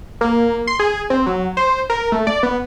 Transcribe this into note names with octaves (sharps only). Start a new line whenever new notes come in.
A#3
C6
G#4
C4
F#3
C5
A#4
A3
D5
B3